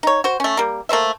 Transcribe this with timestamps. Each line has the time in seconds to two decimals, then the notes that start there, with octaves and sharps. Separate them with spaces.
0.03 D#4 C#5
0.24 F#4 C5
0.40 A3 C#4
0.57 G3 A#3
0.89 A3 A#3 C5 E5